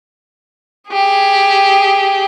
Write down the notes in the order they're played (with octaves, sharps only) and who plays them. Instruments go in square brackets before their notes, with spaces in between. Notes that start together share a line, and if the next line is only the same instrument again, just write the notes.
[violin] G4 G#4